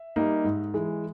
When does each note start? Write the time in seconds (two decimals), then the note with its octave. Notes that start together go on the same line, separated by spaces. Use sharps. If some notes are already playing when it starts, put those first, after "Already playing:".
Already playing: E5
0.16 G3 A#3 D#4
0.44 G#2
0.74 E3 G#3